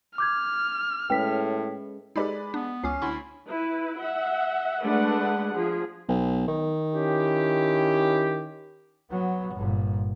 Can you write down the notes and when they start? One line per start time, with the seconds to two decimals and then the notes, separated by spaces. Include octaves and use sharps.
0.18 D6 F6 G6 G#6
1.10 A2 G#3 C#4 B4 G5 B6
2.16 G#3 D#4 G4 A4 B4 D5
2.54 B3 D4
2.84 C#2 C#4 D6 C7
3.02 D2 E4 C6 C#6
3.47 E4 B4
4.00 E5 F#5
4.83 G#3 A3 D4 B4 F#5
5.53 F3 G#4
6.08 B1
6.47 D#3
6.95 C#4 E4 G4
9.11 F#3 B3
9.56 G1 A#2